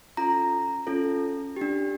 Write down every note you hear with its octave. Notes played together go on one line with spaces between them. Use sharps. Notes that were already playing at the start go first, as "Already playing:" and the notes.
C#4 F4 A4 A#5
C#4 F4 A4
D4 G4